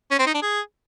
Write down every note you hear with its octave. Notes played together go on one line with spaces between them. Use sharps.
C#4
C4
D#4
D4
G#4